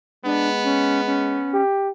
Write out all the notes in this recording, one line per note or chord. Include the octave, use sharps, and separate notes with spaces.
G#3 B3 D4
C#4
C#4
G4